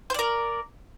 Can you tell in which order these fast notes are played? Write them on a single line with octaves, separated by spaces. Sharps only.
C5 D5 A#4